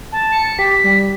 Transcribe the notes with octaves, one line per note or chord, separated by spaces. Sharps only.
A5
C#7
G4 B6
G3